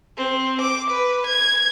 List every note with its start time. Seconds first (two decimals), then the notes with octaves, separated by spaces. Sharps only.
0.17 C4
0.61 D6
0.90 B4
1.27 G#6